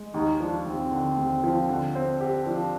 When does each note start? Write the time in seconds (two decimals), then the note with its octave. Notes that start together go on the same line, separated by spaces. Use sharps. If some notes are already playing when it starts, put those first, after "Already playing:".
Already playing: G#3
0.14 D#2 D#4
0.40 F3 D4
0.66 D#2 C4
0.92 D3
1.18 D#2
1.44 F3
1.69 D3
1.95 C4
2.21 G4
2.46 F3 D4